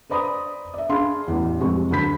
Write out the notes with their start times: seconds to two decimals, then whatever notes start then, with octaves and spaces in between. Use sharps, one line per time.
0.10 B4 C5 D5 A#5 B5 D#6
0.74 D5 E5
0.89 D4 G#4 F5 B5 C6
1.28 A1 E2
1.60 F2 C3 G#3 C#6
1.91 D2 F#3 A4 B5 G6 B6